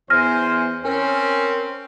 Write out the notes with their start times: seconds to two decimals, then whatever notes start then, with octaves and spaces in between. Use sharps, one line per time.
0.10 E2 C5 G#5 F6 A#6
0.85 C4 C#4 A#4